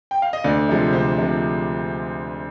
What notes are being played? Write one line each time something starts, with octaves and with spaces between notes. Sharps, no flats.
G5
F5
D#5
D2 D5
C3 F3 G#3
D2 C5
C3 F3 G#3